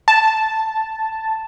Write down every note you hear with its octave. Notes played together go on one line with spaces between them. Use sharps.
A5